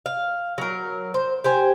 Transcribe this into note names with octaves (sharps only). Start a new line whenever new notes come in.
F5
F#3 A#4
C5
G4 C5 G#5